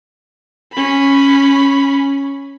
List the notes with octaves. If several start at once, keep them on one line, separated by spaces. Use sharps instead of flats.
C#4 B5